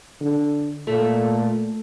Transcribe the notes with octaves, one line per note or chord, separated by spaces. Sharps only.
D3
A#2 A3